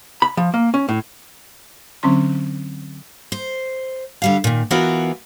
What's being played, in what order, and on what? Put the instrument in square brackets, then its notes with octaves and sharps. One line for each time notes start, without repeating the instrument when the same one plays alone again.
[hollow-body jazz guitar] B5
F3
A#3
C#4
A2
[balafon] D3 F#3 C4 C#4 C6
[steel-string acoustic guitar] C5
D3 G3 F5
A#2 D#3
E3 B3 F4 F#4 A#4 B4